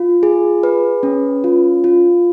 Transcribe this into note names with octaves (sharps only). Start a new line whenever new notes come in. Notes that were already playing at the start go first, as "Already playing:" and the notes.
Already playing: F4
G#4
B4
C#4
F4
F4